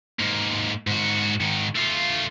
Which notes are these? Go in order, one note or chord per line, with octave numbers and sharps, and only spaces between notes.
G#2 A#3
G#2 F#4
G#2 D#3
A3 F4